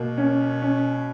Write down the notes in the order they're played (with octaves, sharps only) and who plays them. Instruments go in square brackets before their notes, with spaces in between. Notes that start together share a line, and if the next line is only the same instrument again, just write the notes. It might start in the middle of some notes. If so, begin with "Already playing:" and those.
Already playing: [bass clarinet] B2 [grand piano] A#3
[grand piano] C#4
C#4